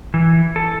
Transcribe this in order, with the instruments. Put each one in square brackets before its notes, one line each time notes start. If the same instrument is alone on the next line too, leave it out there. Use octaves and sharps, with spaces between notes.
[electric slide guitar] E3
A4